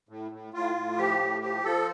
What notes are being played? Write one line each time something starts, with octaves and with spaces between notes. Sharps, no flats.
A2
A2
A2 F4
A2
F3 G4
A2
F3 G4
F3 A4